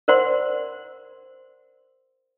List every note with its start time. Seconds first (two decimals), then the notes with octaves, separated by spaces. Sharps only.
0.08 A#4 C5 D5 F#5 C6